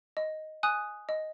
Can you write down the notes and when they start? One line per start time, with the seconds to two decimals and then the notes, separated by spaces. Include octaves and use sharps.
0.17 D#5
0.63 G#5 D#6 F#6
1.09 D#5